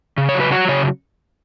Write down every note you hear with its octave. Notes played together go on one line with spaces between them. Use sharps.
C#3
C#5
F#3
B4
F#3 F#4
C#3 C#5